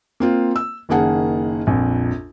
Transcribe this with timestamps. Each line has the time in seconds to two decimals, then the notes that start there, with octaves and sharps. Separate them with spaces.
0.20 A#3 C4 F4
0.56 E6
0.89 F#1 D#3 A#3 G#4 F#5 A5
1.67 A#1 F2